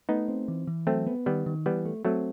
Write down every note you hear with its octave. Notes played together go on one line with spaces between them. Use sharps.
A3 B3 D#4
C4
E3
E3
F#3 A3 C4
B3
D#3 G3 B3
D#3
E3 G3 B3
A3
F#3 A3 C4